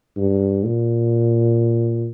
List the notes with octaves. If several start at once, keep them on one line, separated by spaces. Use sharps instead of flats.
G2
A#2